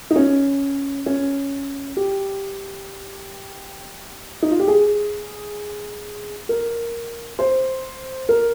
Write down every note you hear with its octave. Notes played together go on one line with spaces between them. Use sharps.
D#4
C#4
C#4
G4
D#4
F4
G4
G#4
A#4
C5
A#4